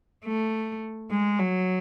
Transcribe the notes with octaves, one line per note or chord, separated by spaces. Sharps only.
A3
G#3
F#3